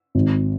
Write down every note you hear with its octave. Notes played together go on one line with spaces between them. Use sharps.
G#1